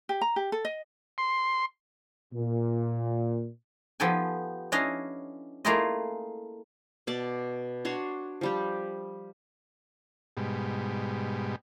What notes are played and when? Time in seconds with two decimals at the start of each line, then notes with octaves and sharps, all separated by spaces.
0.09 G4
0.21 A#5
0.36 G4
0.52 A4
0.65 D#5
1.18 C6
2.34 A#2
4.00 F3 B3 G4 A4 G5 G#5
4.72 C#4 D4 E4 D#5 F5
5.65 A3 A#3 E4 F4 G#4 D#5
7.07 B2 D5 A5
7.85 D4 F#4 C#5 C6
8.41 F3 G3 G4
10.37 G#2 B2 G3